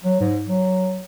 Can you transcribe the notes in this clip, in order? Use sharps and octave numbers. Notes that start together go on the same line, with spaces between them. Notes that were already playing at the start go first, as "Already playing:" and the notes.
F#3
G#2
F#3